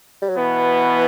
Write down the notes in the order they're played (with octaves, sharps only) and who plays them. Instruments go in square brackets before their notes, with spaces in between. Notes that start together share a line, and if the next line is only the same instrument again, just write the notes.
[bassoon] G3
F#3
[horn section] B2 B3 [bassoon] E3